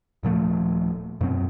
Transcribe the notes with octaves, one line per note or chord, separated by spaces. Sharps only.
D#1 A#2 F3 A3
F#2 B2 F#3 C4